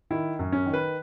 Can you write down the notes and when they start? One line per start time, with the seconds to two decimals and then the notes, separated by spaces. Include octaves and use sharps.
0.10 D#3 E4
0.39 F#2
0.52 C#4
0.66 D#3
0.74 B4